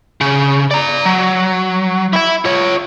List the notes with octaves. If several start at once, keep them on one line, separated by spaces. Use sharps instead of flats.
C#3
D5 A#5
F#3
E4 E5
F4 C#5